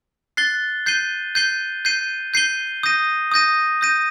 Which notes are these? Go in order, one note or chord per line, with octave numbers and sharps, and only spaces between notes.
F#6 A6 C7 G7
G6 C7 D#7 G7
G6 C7 D#7 G7
G6 C7 D#7 G7
G6 C7 D#7 G7
D#6 G6 A#6 D#7
D#6 G6 A#6 D#7
D#6 G6 A#6 D#7